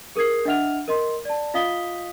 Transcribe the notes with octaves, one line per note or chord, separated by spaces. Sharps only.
G#4 A#4 D#6 G#6 C7
D4 D#5 E5 F#5 F6 F7
A#4 D#5 C6
D5 A5
F4 D#5 F5 D#6 B6 G7